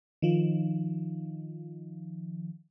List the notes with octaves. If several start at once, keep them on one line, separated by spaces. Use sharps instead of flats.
D#3 F3